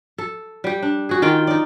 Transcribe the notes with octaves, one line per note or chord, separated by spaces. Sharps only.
A4
G3 G4
D4
F#4 G#4
D#3 F4 G5
D#4 D5